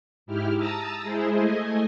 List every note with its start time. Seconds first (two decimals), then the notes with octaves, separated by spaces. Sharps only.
0.26 G#2 E4 G4 F6
0.56 A5 A#5 D#6 E6 A6
1.03 G#3 E4 G#4 C5
1.37 A3 D#5 G#5